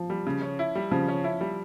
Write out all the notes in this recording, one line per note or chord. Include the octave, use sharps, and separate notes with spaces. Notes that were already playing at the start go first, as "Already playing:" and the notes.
Already playing: F3
G3
C#3
C#4
E4
G3
C#3 F3
C#4
E4
G3